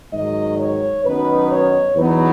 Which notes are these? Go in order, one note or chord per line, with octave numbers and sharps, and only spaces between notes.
G#2 D#3 F#3 D#5
C#5
F#2 D#3 F#3 B3 D#4 B4
C#5
E2 B2 F#3 B3 D#4 B4